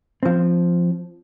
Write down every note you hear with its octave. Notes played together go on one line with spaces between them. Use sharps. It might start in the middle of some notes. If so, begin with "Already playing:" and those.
F3 C4